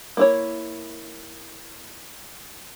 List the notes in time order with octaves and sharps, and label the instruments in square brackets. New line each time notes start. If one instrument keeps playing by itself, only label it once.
[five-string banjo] A#3 E4 C#5